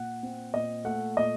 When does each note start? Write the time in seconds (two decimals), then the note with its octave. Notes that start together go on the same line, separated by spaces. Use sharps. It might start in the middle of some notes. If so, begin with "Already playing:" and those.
Already playing: A#2 F#5
0.23 C4
0.54 A#2 D#5
0.85 A3 F#5
1.17 A#2 D#5